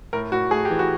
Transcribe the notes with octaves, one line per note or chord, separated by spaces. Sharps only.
A2 A#4
A2 F#4
A3 G#4
E3 G4
F#4